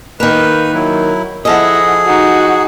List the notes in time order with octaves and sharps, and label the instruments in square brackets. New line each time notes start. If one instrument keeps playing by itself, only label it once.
[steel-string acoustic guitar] D#3 A#3 [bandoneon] B4
[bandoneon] F#3 E4
[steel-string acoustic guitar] F3 A4 D#5 [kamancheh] E4 F#5 [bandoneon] G#4
[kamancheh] D#4 F#4